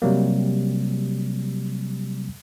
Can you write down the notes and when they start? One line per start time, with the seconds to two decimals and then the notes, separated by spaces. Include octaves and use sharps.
0.02 C3 F#3 G3 A#3